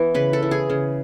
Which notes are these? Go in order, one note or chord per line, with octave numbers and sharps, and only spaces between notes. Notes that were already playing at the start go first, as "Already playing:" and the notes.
Already playing: E3 B3
C#3 B4
A4
E3
G#4
C#3